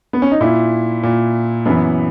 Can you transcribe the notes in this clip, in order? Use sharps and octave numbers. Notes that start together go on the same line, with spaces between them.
B3
C#4
D#4
A#2 E4
A#2
F#2 E3 B3